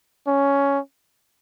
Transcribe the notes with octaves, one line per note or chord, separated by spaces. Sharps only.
C#4